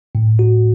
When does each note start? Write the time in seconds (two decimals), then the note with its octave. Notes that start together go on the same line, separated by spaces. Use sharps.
0.15 A2
0.39 F#4